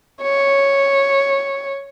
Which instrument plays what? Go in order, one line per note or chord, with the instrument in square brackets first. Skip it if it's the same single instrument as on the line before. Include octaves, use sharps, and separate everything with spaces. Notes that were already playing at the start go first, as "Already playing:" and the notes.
[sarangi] C#5